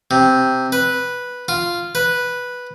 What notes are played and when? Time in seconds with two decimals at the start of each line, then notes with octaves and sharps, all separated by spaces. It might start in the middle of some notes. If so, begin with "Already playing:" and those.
0.11 C3
0.72 B4
1.48 F4
1.95 B4